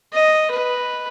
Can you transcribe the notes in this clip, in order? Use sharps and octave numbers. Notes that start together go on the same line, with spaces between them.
D#5
B4